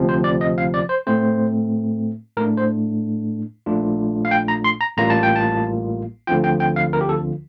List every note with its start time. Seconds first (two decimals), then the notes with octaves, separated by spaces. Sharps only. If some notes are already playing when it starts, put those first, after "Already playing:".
Already playing: D2 C3 F3 C4
0.09 C5
0.24 D5
0.41 D#5
0.58 F5
0.74 D5
0.89 C5
1.07 A2 A3 C4 C5
2.37 A2 A3 D4 A#4
2.58 C5
3.66 A#1 A#2 A3 D4 F4
4.25 F5
4.31 G5
4.48 A#5
4.64 C6
4.81 A#5
4.97 A1 A2 G3 A#3 F4 A#5
5.10 A5
5.23 G5
5.36 A5
6.27 D2 D3 F3 C4 F4 G5
6.44 G5
6.60 G5
6.76 F5
6.93 A#4
7.01 G4
7.09 A4